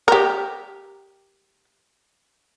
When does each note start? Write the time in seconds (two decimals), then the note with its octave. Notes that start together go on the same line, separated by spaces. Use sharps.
0.08 G4 A#4